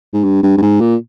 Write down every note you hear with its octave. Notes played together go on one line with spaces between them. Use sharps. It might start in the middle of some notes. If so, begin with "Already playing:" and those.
G#2
G2
G2
G2
G#2
A#2